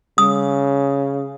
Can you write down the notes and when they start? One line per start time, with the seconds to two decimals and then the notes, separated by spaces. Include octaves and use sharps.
0.18 C#3 D#6